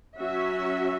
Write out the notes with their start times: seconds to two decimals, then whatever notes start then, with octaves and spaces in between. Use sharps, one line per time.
0.18 F#3 C#4 F#4 E5